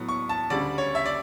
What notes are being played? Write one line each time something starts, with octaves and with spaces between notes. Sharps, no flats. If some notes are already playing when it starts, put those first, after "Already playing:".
Already playing: A2 F#3 B3
C#6
A5
D2 C#3 G3 D5
C#5
E5
D5